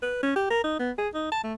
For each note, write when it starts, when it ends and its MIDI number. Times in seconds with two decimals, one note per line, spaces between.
0.02 0.21 71
0.23 0.35 61
0.36 0.47 67
0.50 0.61 70
0.64 0.76 63
0.79 0.91 59
0.98 1.08 68
1.14 1.31 63
1.32 1.39 81
1.44 1.54 57